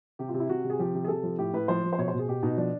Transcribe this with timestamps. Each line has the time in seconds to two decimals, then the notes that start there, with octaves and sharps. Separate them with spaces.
0.19 C3 G4
0.29 F4
0.34 C3
0.40 E4
0.49 C3 F#4
0.64 C3
0.70 G#4
0.79 F3 G4
0.95 C3
1.04 G#4
1.08 C3 A4
1.23 F3
1.38 A2 G4
1.54 A2 B4
1.68 F3 C5
1.84 F3
1.93 C5
1.98 B2 C#5
2.08 C5
2.13 B2
2.19 G#4
2.28 B2 G4
2.43 B2 D#4
2.58 F3 D4